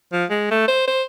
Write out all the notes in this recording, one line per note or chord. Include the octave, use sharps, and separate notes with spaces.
F3
G#3
A3
C5
C5